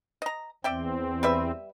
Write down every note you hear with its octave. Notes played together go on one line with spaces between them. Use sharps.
D#5 A#5
E2 C4 D5 E5 G5
G3 B4 E5